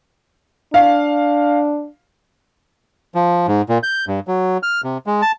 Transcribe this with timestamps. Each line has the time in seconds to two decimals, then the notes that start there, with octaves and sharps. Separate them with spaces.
0.74 D4 F5
3.15 F3
3.48 G#2
3.69 A#2
3.83 G6
4.08 G2
4.28 F#3
4.63 F6
4.84 C3
5.06 G#3
5.22 A5